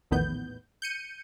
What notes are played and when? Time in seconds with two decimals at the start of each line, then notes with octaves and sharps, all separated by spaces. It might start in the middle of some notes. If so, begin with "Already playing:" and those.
0.11 A#1 E2 A2 D#3 B3 G6
0.82 G6 C#7 D#7